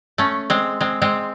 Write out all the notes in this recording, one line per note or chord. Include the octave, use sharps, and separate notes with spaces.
A3 C#4
G#3 C4
G#3 C4
G#3 C4